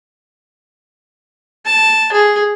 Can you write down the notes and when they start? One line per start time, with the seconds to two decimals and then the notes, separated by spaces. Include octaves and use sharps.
1.65 A5
2.12 G#4